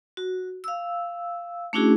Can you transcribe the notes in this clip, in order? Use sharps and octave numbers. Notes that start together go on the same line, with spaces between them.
F#4
F5 E6
A3 C#4 D4 E4 F#4 G#4